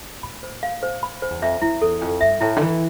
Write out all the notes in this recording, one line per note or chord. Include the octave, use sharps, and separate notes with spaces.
A2 B5
C5
F5
C5
B5
C5
E2
F2 E5
F2 E4
E2 A4
F2 G5
G2 E5
A2 E4
D3
E3 G5